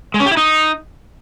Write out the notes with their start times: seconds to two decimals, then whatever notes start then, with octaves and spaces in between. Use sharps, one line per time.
0.14 G#3
0.20 C#4
0.26 G4
0.31 E4
0.37 D#4